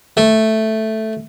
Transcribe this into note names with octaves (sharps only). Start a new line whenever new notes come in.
A3